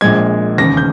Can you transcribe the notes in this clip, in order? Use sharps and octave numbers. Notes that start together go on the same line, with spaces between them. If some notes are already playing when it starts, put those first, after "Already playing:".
A#1 A#2 G#3 G#6
E1 D#2 C#3 A#6
G6